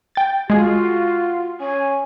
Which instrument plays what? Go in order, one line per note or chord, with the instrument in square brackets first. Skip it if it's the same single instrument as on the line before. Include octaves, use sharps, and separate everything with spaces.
[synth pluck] G5 A6
[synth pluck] G#3 G#4 [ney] F4 [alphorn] F#4
[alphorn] C#4 [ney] G#5